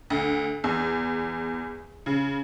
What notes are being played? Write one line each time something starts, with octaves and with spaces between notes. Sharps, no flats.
D2
E2
C#3